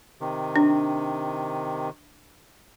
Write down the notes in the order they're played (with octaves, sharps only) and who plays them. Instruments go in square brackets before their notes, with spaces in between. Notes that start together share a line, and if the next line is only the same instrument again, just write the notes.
[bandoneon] C3 D#3
[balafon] D4